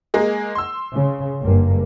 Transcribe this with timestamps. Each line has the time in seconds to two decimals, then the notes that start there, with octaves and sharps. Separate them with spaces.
0.14 G#3 A#3 G#4
0.55 C6 E6
0.94 C#3
1.42 F#1 G2 A#3